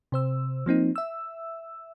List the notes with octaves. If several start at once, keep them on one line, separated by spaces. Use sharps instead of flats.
C3 C5 E6
F3 A#3 C4 D#4
E5 E6